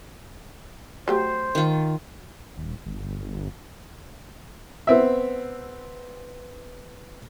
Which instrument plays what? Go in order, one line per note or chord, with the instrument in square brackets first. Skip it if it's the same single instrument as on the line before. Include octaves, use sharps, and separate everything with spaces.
[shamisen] F#3 A3 G4 [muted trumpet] C5
[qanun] D#3 F4
[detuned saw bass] D#1
G1
[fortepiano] B3 C4 E5